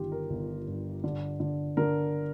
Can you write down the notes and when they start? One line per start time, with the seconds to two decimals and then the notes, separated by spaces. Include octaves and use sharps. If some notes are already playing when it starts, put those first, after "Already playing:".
Already playing: G1 D#3 F4 G4
0.12 A#4
0.30 G1
0.67 G2
1.04 D3
1.40 D3
1.77 D3 A#4